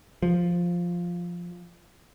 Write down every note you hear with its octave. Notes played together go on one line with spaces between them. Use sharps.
F3